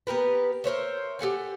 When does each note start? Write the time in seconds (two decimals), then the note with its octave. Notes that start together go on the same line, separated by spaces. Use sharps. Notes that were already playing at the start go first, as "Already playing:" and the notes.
0.07 B3 G4 A#4 B4
0.64 A#4 C5 C#5 E5
1.19 G4 A4 F#5 G#5